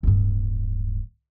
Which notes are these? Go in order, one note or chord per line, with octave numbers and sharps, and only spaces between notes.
D1 G2